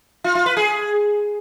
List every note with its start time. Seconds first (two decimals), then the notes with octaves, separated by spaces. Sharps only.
0.24 F4
0.35 F4
0.46 B4
0.57 G#4